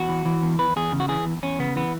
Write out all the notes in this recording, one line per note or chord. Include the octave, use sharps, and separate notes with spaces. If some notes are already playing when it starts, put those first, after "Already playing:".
Already playing: E2 F#4
E3
E3
E2
E2 B4
E2 G#4
C#3
F#4
E3 G#4
E2
E2 C#4
C#3 B3
E3 B3